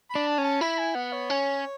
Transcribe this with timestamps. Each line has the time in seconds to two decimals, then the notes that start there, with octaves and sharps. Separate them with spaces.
0.10 B5
0.15 D4
0.27 A5
0.38 C#4
0.44 A5
0.61 E4 B5
0.78 G#5
0.95 B3 F#5
1.12 C#5
1.30 C#4